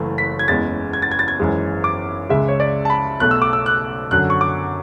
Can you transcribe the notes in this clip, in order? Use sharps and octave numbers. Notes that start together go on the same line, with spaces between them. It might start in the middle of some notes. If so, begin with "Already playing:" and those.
Already playing: F#1 F#2 E3 A3
B6
G#6
F#1 E2 C#3 G#3 A6
G#6
A6
G#6
A6
G#6
G#1 F#2 E3 G#3
D6
C#2 C#3 G#3 E5
C#5
D5
A5
B5
B1 B2 A3 F#6
E6
D6
E6
F#6
F#2 D3 F#3 F#6
C#6
D6